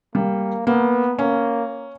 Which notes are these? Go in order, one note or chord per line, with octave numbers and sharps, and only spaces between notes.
G3 A#3
A#3 B3
A#3 C#4